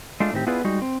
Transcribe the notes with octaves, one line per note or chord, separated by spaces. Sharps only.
G#3 A3 D4 F4
A2 D#3 C4 G4
B3 E4 F4 G#4 B4 D5
G3 G#3 D#4 F#4
C4